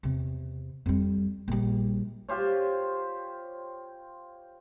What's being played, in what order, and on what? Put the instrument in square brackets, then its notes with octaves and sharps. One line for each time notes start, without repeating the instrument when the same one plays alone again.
[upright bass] E2 C3
F2 G3
A#1 G3
[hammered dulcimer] F4 G4 C5 C#5